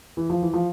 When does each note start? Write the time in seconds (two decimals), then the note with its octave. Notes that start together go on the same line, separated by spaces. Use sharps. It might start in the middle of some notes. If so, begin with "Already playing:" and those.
0.17 E3
0.30 F3
0.42 E3
0.54 F3